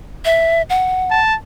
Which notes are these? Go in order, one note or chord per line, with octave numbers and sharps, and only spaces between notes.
E5
F#5
A5